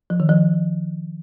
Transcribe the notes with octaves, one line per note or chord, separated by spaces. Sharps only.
F3
D#3
F3